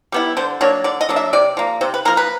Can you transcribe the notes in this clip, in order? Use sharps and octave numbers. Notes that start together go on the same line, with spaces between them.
G3 B3 E4
D3 C5
F#3 A#3 D4 C#5
D3 D5
D#5
F#3 A#3 D4
E5
C3 D5
F3 A#3
C3 C5
B4
F3 A#3 A#4
B4